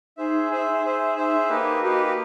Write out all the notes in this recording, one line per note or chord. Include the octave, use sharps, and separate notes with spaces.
D#4 G#4 C5 E5
G#4 C5 E5
G#4 C5 E5
D#4 G#4 C5 E5
A#3 D#4 G4 B4
A#3 D#4 F#4 G4 B4